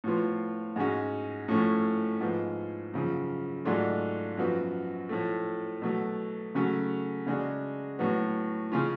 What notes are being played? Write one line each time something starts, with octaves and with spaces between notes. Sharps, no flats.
A2 F3 B3 F4
G#2 G#3 C#4 F#4
A2 F3 A3 C#4
G#2 F3 B3
F#2 C#3 F3
G#2 F#3 A3 D4 F4
F#2 F3 B3 F#4
A2 F3 A3
B2 F#3 A3
C#3 F#3 A3 C#4 F#4
C#3 G#3 D4 F#4
A2 F#3 B3 F#4
C#3 G#3 C#4 F4